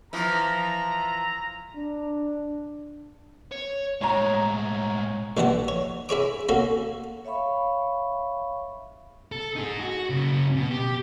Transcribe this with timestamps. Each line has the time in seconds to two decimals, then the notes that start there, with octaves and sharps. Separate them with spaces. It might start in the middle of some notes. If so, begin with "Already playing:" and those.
0.13 E3 F3 A#5
1.75 D4
3.52 C#5
4.01 A2 G#3 C#5 A#5
5.37 A#1 E3 G3 F#5 A5
5.68 C#5
6.09 E4 G#4 C#5 D6
6.49 A#3 C#4 F#4 A4
7.25 C#5 E5 F5 B5 C#6
9.32 A4
9.56 D#4 G#4
9.80 F#4
10.10 F#2 C#3
10.56 B2
10.71 G4